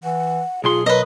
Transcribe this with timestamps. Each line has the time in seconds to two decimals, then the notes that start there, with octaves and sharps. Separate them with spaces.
0.04 E3 F#5
0.64 B1 F4 G#4 C6
0.86 F#3 A#4 B4 D#5